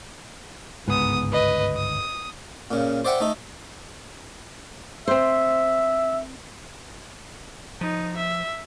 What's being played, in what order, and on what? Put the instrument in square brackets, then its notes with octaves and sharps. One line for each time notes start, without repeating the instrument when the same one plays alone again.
[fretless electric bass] G1 C#2 G#2 [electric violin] B3 D#6
[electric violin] B4 D#5
D#6
[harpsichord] A#2 C#3
C5 D5 E5 F#5 G5
A3 D#4 A4
[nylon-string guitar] C4 C5 [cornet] E5
[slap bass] F3 [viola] D#4
[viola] E5